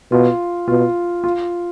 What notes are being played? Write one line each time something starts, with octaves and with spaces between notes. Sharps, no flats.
B2 F4
B2 F4
F4